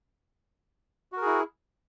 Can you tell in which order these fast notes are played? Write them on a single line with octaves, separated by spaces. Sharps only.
F#4 A#4 G#4 E4